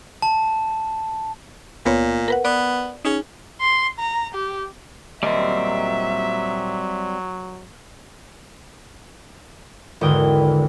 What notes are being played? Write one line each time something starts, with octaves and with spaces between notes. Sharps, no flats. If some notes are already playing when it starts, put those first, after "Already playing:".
A5
C#2 A#2 B3 C#5
A#4 B4 F#5
B3 D5
C#4 D#4 G#4
C6
A#5
G4
A#2 F#3 G3 A#3 C4 D#5 E5
G#1 E2 D3 B4 G5 D#6